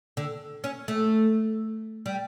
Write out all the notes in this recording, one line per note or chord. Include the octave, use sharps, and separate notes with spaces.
D3
C#4
A3
G3